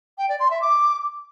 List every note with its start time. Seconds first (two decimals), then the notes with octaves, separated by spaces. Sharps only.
0.18 G5
0.29 D5
0.40 C6
0.51 E5
0.61 D6